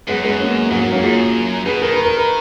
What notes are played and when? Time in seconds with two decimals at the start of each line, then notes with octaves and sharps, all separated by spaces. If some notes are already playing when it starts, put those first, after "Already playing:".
0.08 F#2 G#3 B3
0.23 F#2 G#3 B3
0.39 A#3 C#4
0.71 G#2 F#3 A#3
0.81 F#3 A#3
0.92 A#3 C#4
1.03 F#2 F4 G#4
1.66 B2 G#4 B4
1.82 D#3 A#4
1.94 B4
2.05 A#4
2.17 B4